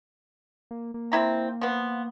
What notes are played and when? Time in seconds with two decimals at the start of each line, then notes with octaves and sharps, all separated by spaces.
0.71 A#3
0.94 A#3
1.12 C4 E4 A#5
1.61 F3 B3